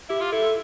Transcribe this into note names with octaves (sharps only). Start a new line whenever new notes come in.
E4 G4
F4
E4 A4